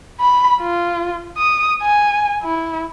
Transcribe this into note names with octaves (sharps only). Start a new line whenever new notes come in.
B5
F4
D#6
G#5
E4